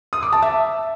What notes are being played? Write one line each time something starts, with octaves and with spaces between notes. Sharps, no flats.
D#6
D6
A5
E5